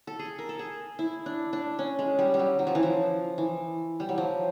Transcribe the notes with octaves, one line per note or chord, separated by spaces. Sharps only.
A4
G#4
A#4
A4
G#4
E4
D4
D4
C#4
G#3
G3
G3
F#3
F#3
F3
E3
F3
E3
G3
F#3
F3